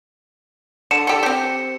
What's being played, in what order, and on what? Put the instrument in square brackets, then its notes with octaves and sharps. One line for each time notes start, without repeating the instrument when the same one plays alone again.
[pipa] D3 [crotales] C#7 E7
[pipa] G4 A4
C4 G4